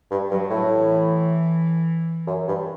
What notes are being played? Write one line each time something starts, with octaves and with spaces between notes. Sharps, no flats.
G2
G2 F#3
A2
E3
F#2
G2